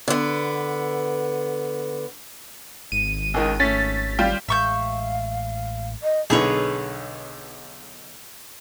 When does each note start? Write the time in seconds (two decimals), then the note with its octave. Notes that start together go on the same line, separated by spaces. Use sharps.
0.08 D3 B3
2.92 G#1 D#7
3.34 C#2 D#3
3.60 A3 C#4 A6 B6
4.19 G3 F4 G4
4.49 A1 G#3 E5 F5 C#6 G6
6.03 D#5
6.30 B1 D3 D#4 G#4 B4 C#5